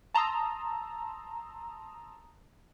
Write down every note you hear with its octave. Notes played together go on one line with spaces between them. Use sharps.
A5 A#5 C6 D#6 E6